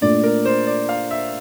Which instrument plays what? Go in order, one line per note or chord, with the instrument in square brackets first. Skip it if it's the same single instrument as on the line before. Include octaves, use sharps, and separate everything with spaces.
[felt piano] A#2 A3 D4 [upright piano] D5
[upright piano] A#4
C5
D5
F5
E5